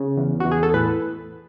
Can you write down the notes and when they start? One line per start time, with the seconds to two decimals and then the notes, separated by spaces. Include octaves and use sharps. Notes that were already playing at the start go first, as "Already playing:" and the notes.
Already playing: C#3
0.17 E2
0.40 E2 F#4
0.52 G#4
0.63 A4
0.74 A2 B4